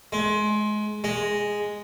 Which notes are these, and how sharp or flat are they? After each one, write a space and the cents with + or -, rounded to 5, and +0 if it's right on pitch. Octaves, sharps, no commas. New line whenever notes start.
G#3 +25
G#3 -5